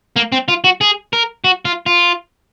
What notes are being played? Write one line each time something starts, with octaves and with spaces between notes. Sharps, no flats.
A#3
C4
F4
F#4
G#4
A#4
F#4
F4
F4